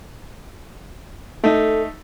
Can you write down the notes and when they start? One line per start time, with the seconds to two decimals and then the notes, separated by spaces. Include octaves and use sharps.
1.44 A3 D#4 A4